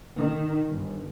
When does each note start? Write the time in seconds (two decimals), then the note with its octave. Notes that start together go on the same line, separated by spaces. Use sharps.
0.18 D#3
0.69 G1